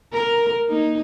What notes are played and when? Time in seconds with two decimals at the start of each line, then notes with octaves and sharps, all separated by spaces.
0.13 A#4
0.68 A#3 D#4